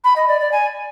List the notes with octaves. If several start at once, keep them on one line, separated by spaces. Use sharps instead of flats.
B5
D#5
D5
D5
G#5